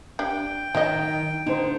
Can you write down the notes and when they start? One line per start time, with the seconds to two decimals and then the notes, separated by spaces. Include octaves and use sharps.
0.19 D4 G4 G5
0.75 D#3 F#3 C#5 D#5
1.47 D3 D#4 C5